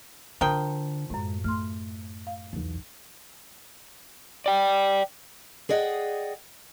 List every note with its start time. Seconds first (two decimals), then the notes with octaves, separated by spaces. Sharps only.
0.41 D3 F3 A#4 G5 D#6
1.10 F#2 A2 G#3
1.44 A3 C6 F6
2.27 F5
2.53 B1 E2
4.46 D5 G5
5.69 G#4 D5 D#5 F#5 G5